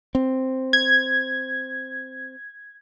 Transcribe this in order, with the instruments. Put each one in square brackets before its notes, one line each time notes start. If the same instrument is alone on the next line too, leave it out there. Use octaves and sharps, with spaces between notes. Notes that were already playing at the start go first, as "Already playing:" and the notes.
[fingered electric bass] C4
[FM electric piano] G#6